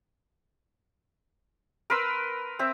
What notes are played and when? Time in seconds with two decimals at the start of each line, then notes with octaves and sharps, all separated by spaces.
1.90 A#4 B4 C6 E6
2.59 C4 E5